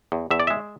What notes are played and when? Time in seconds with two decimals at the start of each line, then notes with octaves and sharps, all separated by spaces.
0.12 E2
0.31 E2 E5
0.40 D5
0.47 G#3 E5